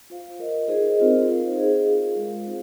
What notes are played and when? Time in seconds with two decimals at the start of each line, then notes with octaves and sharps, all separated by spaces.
0.10 F4 C5 F5
0.39 F4 A#4 D#5
0.68 D#4 G#4 C5 D#5
0.98 C4 F4 A#4 D#5
1.28 D#4 C5 F5
1.57 F4 G#4 D#5
1.87 F4 A#4 F5
2.16 G#3 F4 C5 F5
2.46 C4 D#4 G#4